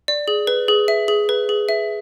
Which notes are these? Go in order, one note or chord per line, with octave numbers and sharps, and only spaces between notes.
D5
G#4
B4
G#4
E5
G#4
B4
G#4
E5